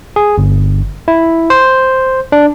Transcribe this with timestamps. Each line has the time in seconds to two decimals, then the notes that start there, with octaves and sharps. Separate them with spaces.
0.16 G#4
0.38 G1
1.08 E4
1.50 C5
2.32 D4